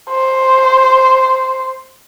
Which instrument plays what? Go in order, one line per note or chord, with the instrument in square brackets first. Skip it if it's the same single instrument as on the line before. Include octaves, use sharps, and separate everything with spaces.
[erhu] C5